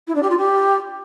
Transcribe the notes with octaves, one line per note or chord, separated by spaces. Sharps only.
E4
D4
G4
F4
G4